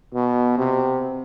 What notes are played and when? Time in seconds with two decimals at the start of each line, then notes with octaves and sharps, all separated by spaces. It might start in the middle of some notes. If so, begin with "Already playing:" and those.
0.14 B2
0.58 C3